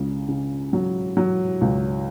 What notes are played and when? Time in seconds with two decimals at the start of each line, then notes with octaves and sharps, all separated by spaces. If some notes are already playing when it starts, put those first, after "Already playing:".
Already playing: C#2 C#3
0.28 C#3
0.73 F#3
1.17 F#3
1.61 C#2